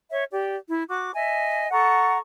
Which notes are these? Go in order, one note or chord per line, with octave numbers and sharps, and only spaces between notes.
C#5 E5
G4 D5
E4
F#4 D6
D#5 E5 G#5
A4 F#5 A#5 C#6